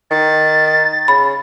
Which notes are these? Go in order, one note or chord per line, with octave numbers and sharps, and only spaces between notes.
D#3 A6
C#3 B5